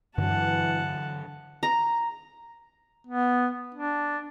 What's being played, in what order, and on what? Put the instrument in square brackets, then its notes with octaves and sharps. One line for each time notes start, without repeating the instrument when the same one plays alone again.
[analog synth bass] G2 [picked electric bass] D3 F#3 [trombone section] E3 [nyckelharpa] F#5 A5
[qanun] A#5
[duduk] B3
D4